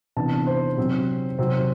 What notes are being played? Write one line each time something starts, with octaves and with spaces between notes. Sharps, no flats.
C3 E3 B3 D4 A5
C5
C3 F#3 C4
C3 F#3 C4